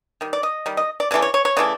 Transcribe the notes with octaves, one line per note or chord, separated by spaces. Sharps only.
D#3 G3
D5
D#5
D#3 G3
D#5
D5
C#3 E3 A3 D5
C#5
C#5
C#5
C#3 E3 A3 D5